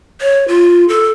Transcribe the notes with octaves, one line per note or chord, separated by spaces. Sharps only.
C#5
F4
A4